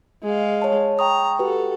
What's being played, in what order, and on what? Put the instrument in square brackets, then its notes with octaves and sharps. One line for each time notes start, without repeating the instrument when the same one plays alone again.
[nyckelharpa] G#3 F5
[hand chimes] C#5 A5
[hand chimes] G5 C#6 D#6 [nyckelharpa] A#5
[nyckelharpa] F#4 A4 [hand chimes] G4 B4